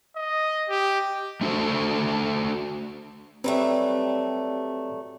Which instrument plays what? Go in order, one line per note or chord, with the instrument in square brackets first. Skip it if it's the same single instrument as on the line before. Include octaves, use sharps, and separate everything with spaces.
[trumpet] D#5
G4
[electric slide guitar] A3 D4 F#4 A4 C5
[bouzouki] F#3 G3 A3 [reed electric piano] C4 B4